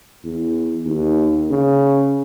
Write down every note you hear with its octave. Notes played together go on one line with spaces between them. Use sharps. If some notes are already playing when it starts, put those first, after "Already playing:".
E2
D#2
C#3